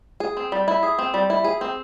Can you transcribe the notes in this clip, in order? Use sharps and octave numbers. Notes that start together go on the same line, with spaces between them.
G#4
C4
G3
E4
G#4
C4
G3
E4
G#4
C4